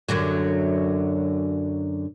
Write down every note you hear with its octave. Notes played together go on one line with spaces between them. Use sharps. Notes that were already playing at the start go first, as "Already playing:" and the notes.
F#2 D3 F#3